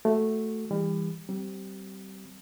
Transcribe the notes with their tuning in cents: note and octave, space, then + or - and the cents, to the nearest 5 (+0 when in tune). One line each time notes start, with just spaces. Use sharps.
A3 +0 F#4 +0
E3 +0 G3 +35
G3 -25 C4 +0